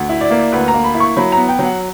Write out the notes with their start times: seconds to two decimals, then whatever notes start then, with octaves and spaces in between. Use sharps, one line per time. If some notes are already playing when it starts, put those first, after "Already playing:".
Already playing: D2
0.09 E4
0.21 D5
0.30 A#3
0.52 D2 B4
0.68 A#5
0.74 A#3
0.84 B5
0.95 E4
1.00 C#6
1.16 F#3 B5
1.32 A#5
1.37 B3
1.49 G5
1.59 F#3
1.64 F#5